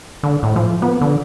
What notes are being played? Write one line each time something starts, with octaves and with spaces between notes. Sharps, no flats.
D3
A2
F3
B3
D3